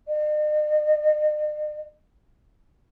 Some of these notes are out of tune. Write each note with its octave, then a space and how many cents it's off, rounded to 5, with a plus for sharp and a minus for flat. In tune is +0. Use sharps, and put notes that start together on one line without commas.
D#5 -45